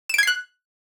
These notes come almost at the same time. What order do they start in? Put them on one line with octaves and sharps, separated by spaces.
E7 D7 G#6 C7 F#6